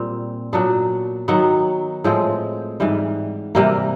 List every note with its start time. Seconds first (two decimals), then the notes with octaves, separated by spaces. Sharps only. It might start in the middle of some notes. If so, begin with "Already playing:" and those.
Already playing: A#2 G3 C4
0.53 A#2 F#3 B3 D4
1.28 D#3 F#3 B3
2.04 A2 F3 G#3 C4
2.80 G#2 E3 G3
3.55 C3 E3 G3 A#3